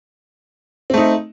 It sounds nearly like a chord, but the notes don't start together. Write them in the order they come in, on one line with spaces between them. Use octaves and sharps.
C4 A3 D#4